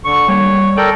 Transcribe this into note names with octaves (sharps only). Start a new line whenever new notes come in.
D3 C#6
G3 A#3 C#5
A4 A#4 D5 G5